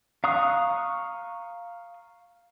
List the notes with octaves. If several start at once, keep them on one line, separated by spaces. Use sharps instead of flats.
F5 A#5 C#6 D#6 F#6